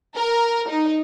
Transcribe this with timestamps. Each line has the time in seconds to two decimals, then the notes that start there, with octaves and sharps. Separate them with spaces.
0.16 A#4
0.69 D#4